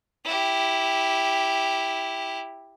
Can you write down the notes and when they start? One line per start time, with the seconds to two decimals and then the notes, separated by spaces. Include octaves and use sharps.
0.25 E4 G4